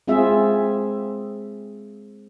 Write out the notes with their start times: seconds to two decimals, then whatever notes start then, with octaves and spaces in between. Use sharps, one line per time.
0.07 G#3 C4 F4 G#4 E5